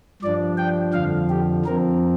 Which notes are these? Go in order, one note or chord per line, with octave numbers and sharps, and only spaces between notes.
G2 F3 D4 D5
G5
F2 D3 F3 F5
G4
F2 F3 C4 A#4